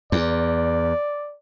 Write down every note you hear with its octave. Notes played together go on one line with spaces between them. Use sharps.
E2 D5